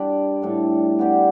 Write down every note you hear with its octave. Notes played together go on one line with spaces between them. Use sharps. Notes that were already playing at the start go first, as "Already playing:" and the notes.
Already playing: G3 D4 G4 D5
A2 G3 D4 A4
B3 G4 D5